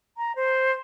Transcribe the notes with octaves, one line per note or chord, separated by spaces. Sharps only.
A#5
C5